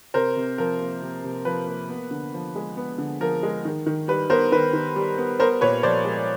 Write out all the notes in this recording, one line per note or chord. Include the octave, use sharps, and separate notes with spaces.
C3 A#4 C5
C3
F3 A#4
A#3
C3
C3
F3 B4
A#3
B3
D3
F3
G#3
B3
D3
F3 A#4
G#3
D#3
D#3
G3 B4
B3 A#4 C5
D#3 B4
D#3
G3
B3
B3 A#4 C5
A#2 B4 C#5
F3 C5 D5
G#3